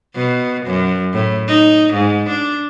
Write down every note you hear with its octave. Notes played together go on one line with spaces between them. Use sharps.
B2
F#2
A2
D#4
G#2
D4